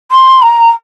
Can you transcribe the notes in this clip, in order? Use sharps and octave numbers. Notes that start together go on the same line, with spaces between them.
C6
A#5